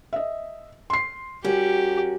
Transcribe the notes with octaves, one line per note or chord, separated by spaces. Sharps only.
D#5 E5
C6 C7
G3 C#4 F#4 G4 A#4